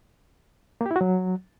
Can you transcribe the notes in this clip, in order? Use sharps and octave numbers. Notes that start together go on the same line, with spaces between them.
A#3
G4
E4
F#4
F#3